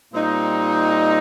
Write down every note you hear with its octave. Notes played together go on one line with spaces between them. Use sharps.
A#2 G3 C4 D#4